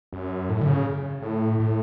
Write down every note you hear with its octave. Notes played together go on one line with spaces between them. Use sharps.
F#2
A2
D3
C#3
A2
A2